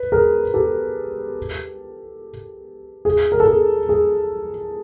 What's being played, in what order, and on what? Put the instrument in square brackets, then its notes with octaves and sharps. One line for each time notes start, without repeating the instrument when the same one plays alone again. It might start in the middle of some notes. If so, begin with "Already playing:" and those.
Already playing: [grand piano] B4
G#4 A#4
G4 A4
G#4
A#4
A4
G#4
G#4